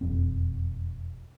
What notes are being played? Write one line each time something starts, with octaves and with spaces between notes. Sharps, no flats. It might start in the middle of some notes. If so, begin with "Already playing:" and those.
E1 F2 C4